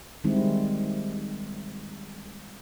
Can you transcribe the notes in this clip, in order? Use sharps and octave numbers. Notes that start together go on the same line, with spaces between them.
D#3 G3 G#3 C4 E4